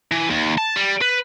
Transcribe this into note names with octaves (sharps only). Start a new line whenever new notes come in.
E3
D#2
A5
G3
B4